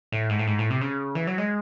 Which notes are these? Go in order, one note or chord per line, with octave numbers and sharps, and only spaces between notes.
A2
G#2
A2
G#2
A2
C3
C#3
E3
F#3
G#3